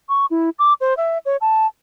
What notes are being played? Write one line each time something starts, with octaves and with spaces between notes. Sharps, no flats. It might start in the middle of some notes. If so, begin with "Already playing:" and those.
C#6
E4
D6
C5
E5
C#5
A5